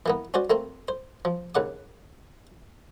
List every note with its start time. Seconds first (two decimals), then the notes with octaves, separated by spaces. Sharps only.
0.06 E3 A#3 B3
0.34 C#4 F#4 C5 D5
0.50 A3 A#3 C4
0.88 C5
1.25 F3
1.55 D#2 C#3 F#5 D6